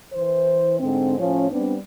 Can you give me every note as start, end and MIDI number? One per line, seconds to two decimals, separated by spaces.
0.13 0.75 52
0.13 0.75 72
0.80 1.16 44
0.80 1.16 50
0.80 1.16 60
1.19 1.47 45
1.19 1.47 53
1.19 1.47 61
1.51 1.75 55
1.51 1.75 59
1.51 1.75 60
1.51 1.75 62